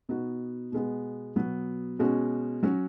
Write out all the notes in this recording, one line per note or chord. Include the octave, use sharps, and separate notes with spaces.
B2 B3 D#4 F#4
B2 G#3 B3
B2 F#3 B3 F#4
B2 G#3 C#4 F#4
F#3 C#4 F#4